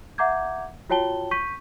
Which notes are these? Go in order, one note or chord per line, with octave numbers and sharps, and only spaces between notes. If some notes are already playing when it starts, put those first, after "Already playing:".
E5 F#5 A#5 D6 G6 G#6
F4 F#4 C#5 G5 A5 G7
C#6 G6 B6 D#7